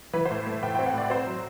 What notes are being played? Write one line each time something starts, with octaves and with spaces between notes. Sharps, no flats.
E3 B4
C5
A2
A3
A2 G5
G5
C4
F#5
A2 D5
C4 C5
F#3